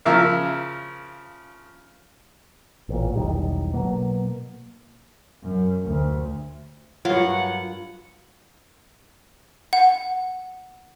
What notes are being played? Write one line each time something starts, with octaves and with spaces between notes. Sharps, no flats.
C#3 F3 A#4 E5 F5
A1 A#2
E1 B1 D#3 G3
B2 F#3 A#3
F#2
D2
G2 F#3 F4 A#4 F#5
F#5